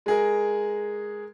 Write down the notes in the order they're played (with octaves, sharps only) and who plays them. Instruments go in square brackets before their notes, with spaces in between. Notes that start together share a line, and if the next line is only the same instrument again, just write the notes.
[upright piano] G#3 G#4 A#4